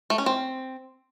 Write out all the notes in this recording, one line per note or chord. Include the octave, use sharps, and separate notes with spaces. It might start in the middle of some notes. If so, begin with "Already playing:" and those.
A3
C#4
C4